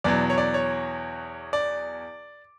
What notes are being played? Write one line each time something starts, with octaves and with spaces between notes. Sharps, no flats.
E2 B2 F#3 D5
C#5
D5
C#5
D5